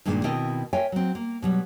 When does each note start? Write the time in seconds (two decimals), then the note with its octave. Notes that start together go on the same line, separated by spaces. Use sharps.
0.05 G2 A#2 D#3 G#3 B3 D4
0.24 B2 D#3 C4 E4 A#4 D#5
0.73 A#4 C#5 E5 G5 G#5
0.92 F#3 C4
1.15 A#3
1.42 B2 F#3 G3